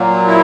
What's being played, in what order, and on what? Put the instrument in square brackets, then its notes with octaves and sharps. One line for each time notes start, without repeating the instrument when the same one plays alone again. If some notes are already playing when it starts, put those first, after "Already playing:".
Already playing: [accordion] A#2 F#3 A#3
E4